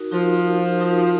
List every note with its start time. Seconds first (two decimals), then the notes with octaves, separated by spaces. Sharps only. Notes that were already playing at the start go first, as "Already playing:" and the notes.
Already playing: D#4 F#4 A#4
0.11 F3 D#4 F#4 A#4
0.80 D#4 F#4 A#4